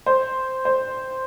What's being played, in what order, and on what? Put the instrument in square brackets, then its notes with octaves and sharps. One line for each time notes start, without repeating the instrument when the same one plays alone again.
[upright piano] C5
C5